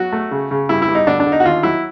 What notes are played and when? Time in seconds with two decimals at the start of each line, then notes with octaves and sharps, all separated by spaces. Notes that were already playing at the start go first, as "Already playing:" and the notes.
Already playing: F#3 F#4
0.12 A3
0.31 C#3
0.51 C#3
0.69 G2 E4
0.82 E4
0.88 G2
0.95 D#4
1.07 D3 D4
1.20 D4
1.26 D3
1.32 D#4
1.40 F#4
1.45 D#2 F4
1.63 F#3 E4